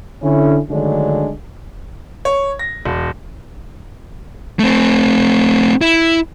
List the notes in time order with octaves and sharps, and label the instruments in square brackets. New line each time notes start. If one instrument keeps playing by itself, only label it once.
[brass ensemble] D3 C#4 E4
D3 D#3 F#3 G#3 A3 D4
[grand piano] C#5
A#6
E1
[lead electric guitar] A3 C4
E4